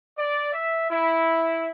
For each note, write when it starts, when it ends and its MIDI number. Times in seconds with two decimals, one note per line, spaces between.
0.18 0.53 74
0.53 0.89 76
0.91 1.70 64